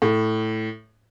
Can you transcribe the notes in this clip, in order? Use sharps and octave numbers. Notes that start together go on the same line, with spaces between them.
A2